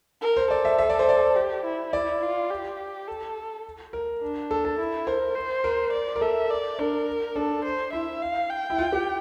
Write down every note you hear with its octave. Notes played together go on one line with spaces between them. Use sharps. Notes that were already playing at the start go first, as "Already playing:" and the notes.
A#4
C5
A4 D5
E5
E5
D5
C5
D5
G4
E4
D5
F4
G4
A4
A#4
D4
A4
A4
E4
A#4 C5
C5
A#4
D5
A#4
A4 E5
D5
D4 A#4
D4 A4
C5
E4 E5
F5
G5
E4
F4
G4